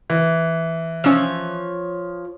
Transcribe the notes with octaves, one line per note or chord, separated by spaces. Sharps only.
E3
F3 C#4 C#5 E6